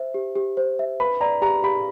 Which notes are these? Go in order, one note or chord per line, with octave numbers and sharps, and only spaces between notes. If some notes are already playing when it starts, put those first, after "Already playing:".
Already playing: C5 E5
G4
G4
C5
E5
B4 B5
D5 A#5
G4 A#5
G4 B5